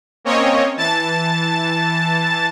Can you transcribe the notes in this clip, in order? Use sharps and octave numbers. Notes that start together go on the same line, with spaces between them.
A#3 C4 C#4 C#5 D#5
E3 A5 A6